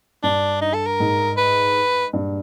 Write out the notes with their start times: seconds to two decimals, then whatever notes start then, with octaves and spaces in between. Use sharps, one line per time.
0.23 G2 D4
0.62 D#4
0.74 A4
0.86 A#4
1.00 G#2
1.37 B4
2.13 G2